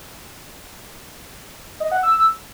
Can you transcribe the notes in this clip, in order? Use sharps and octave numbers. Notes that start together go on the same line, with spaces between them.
D#5
F#5
E6